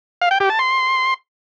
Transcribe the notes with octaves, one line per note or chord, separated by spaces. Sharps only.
F5
G5
G4
A5
C6